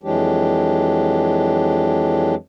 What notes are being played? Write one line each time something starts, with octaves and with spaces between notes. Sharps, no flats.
F2 E3 F#3 G#3 D4 G4